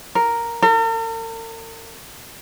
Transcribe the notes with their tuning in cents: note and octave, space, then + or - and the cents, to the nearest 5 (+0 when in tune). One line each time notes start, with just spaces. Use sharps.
A#4 +0
A#4 -45